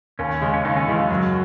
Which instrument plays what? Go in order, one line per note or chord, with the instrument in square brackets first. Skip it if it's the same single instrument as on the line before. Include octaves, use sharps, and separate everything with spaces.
[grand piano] D#2 [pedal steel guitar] C#4
[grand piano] C#3 G#3
[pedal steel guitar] C#4
[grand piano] D#2 [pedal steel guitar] D#4
[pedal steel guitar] C#4
[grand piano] C#3 G#3 [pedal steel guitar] E3
[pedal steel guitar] F#3
[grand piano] F#2